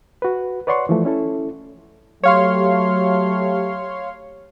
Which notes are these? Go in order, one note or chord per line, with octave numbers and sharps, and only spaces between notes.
F#4 B4
B4 C#5 D5 F#5 C6 C#6
E3 F3 A3
C#4 E4 A4
F#3 A3 G4 C#5 F5 C6